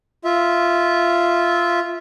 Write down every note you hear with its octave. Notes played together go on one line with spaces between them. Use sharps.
F4 E5